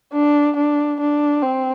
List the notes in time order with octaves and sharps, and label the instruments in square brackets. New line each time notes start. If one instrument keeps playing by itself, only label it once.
[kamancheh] D4
D4
D4
C4